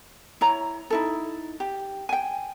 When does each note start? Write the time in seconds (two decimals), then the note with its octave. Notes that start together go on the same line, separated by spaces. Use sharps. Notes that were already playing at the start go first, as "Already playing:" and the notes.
0.41 E4 C#5 A#5
0.90 D#4 E4 A4
1.60 G4
2.09 G5 G#5